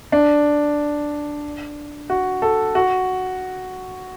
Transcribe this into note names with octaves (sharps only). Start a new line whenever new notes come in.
D4
F#4
A4
F#4